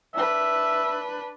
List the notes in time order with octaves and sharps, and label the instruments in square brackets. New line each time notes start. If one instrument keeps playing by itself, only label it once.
[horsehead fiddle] D4 B4 [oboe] E5